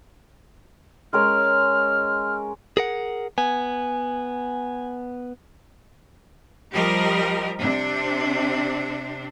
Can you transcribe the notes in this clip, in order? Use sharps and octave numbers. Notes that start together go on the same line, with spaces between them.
G#3 C#4 A#4 F6
G#4 A#4 F#5
B3 G#5
F3 G3 G4 A#4 D#5
C3 C4 D4